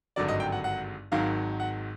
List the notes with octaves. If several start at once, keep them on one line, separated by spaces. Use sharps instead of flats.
G#1 G2 D3 F#3 D5
D#5
G5
F#5
F#5
G#1 G#2 D#3 F#3 F5
F#5